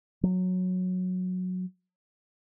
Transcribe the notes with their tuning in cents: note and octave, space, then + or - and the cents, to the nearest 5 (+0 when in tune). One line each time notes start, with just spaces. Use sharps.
F#3 -15